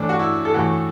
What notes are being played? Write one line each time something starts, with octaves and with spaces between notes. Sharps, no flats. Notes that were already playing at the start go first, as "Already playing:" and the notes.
Already playing: A2 E3 A3 D4
F#4
E4
A4
A2 E3 A3 F#4